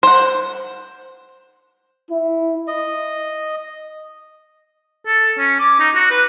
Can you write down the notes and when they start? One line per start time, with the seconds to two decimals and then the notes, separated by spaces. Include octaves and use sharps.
0.03 C5 F#5
2.11 E4
2.67 D#5
5.07 A4
5.38 C#4
5.59 D6
5.80 D#4
5.95 F#4
6.11 B4